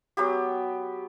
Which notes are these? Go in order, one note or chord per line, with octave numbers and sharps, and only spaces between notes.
F#3 B3 G4